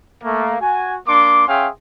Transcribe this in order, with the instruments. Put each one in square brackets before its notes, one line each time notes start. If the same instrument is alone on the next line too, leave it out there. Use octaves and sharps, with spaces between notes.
[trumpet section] A3 A#3 F5
F#4 G#5
A#3 D4 C6 D6
C#4 G#4 E5 F5 G5 C6